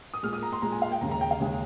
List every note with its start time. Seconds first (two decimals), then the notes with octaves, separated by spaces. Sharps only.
0.14 D#6
0.23 A#2 G#3 F6
0.33 D#6
0.43 A#5
0.53 C6
0.62 A#2 G#3 A#5
0.72 G#5
0.82 F5
0.92 G5
1.01 D#2 C#3 G#3 A#5
1.11 A#5
1.21 G5
1.31 F5
1.40 D#2 C#3 G#3